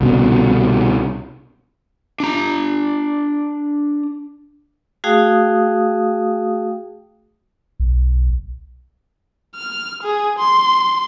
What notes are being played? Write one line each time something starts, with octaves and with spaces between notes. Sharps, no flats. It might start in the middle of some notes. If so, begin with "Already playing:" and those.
C2 B2 D3
D4 A#5
A3 F#4 G#4 F5 G5 D#6
B1
F6
G#4
C6